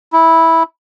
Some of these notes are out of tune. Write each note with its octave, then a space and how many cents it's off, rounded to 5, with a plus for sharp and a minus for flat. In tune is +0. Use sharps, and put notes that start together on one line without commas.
E4 -10